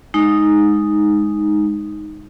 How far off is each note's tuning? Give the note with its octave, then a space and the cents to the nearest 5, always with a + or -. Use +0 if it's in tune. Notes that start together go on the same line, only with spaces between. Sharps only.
G#3 +0 D#4 +0